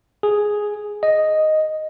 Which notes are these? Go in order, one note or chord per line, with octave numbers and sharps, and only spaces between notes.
G#4
D#5